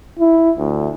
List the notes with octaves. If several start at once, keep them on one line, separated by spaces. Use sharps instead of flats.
E4
D2